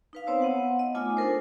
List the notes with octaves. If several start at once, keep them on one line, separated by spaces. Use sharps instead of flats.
D#4 B4 F5
B3 C4 C5 C#5 A5 E6
B3 F#5 A5
D#5
A3 D#4 F4 G#5 A5 D6
D4 A4 A#4 C5